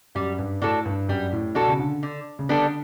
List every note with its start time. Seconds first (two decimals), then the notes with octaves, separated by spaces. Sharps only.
0.15 F#2 G3
0.39 G2
0.61 A2 D4 F#4 A4
0.85 G2
1.09 F#2 G3
1.32 A2
1.55 B2 D4 F#4 A4
1.68 C#3
1.79 D3
2.03 D3
2.39 C#3
2.49 D3 G3 B3 D4 A4